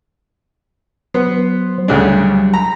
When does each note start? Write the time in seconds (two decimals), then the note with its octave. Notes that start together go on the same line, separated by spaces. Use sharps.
1.14 F#3 B3 C5
1.88 D2 C#3 F#3 G3 D4
2.54 A#5 B5